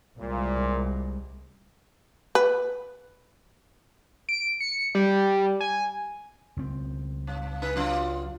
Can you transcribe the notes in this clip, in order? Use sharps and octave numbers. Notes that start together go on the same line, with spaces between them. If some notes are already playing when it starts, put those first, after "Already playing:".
C2 A#2 G#3
B4
D7
C#7
G3
G#5
C#2 C4
G2
D#4 G#4 B4
F#3 D4 F4